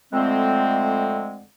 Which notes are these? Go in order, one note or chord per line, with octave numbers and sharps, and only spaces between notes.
F2 D3 G#3 A3 C4